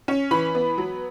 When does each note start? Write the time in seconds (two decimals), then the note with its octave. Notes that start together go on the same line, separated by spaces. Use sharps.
0.08 C#4
0.31 E3 B5
0.55 B3
0.78 F#3